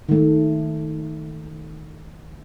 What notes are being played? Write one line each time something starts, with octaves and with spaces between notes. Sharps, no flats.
D#3 A3